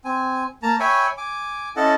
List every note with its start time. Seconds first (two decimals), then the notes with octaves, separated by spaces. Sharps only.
0.05 C4 G#5
0.63 A#3 A5 A#5
0.80 C#5 E5 G5 G#5 B5 C#6
1.17 G#5 D6
1.76 C#4 E4 A4 D#5 F#5 A5